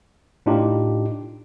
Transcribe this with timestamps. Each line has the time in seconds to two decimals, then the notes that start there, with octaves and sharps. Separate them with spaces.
0.46 A2 D4 D#4 F4 G4